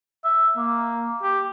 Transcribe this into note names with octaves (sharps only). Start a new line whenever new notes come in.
E5
A#3
G4